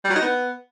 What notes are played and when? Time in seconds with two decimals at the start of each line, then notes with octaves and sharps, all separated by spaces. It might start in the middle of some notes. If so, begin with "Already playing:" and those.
0.04 G3
0.10 F#3
0.16 D#4
0.22 B3